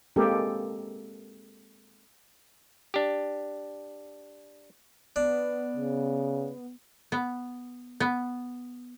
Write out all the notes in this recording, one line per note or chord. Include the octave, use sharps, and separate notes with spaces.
G#3 A#3 C4 G4 A4 A#4
D4 G4
B3 D4
C#3
B3
B3